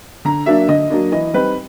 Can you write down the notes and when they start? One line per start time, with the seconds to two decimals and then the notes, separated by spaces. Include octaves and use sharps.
0.25 D3 A#5
0.46 F#3 A#3 D4 E5
0.69 D3 D#5
0.90 F#3 A#3 D4
1.12 E3 D#5
1.33 G3 C4 D#4 B4